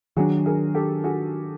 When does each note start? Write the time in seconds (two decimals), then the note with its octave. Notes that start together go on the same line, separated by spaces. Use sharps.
0.17 D#3 F#3 B3 D4 F#4 G#4
0.46 G#4 A#4
0.74 G4 A4
1.04 F#4 G#4